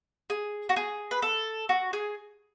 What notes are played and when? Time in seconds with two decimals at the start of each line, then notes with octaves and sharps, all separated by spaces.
0.30 G#4
0.69 F#4
0.76 G#4
1.11 B4
1.22 A4
1.69 F#4
1.93 G#4